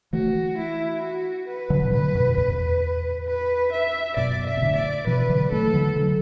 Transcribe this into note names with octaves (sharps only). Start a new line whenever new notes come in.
E3 A3 F#4
E4
F#4
B4
D3 F#3
B2
A2 D3 B4
F#2 B2
E2 A2 B4
B4
E5
F#2 B2 D5
E5
B2
A2 D3
D5
B2 E3 B4
D3 F#3
E3 A3 A4
D3 F#3
D3 F#3